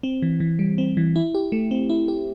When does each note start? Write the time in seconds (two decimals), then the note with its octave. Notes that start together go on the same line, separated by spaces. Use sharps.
0.03 C4
0.22 E3
0.40 E3
0.59 G3
0.78 C4
0.97 E3
1.16 E4
1.35 G4
1.52 A3
1.71 C4
1.89 E4
2.08 G4